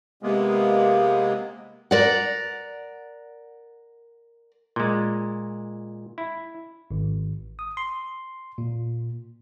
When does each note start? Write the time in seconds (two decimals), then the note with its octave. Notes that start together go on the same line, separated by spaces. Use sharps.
0.23 C3 G#3 A#3 B3
1.91 A#4 D5 F#5
4.76 A#2 G#3
6.18 E4
6.91 G#1
7.59 D#6
7.77 C6
8.58 A#2